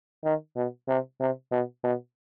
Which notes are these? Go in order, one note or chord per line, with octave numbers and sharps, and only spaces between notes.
D#3
B2
C3
C3
B2
B2